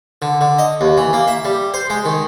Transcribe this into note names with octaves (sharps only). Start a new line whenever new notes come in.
D3
D3
D#5
D#2
E3
A#3
E5
G3
C5
G#3
D#3